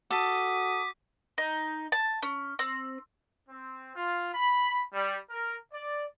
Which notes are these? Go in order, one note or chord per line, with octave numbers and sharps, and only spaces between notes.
F#4 A4 D6 D#6 B6
D#4
A5
C#4
C4
C4
F4
B5
G3
A#4
D5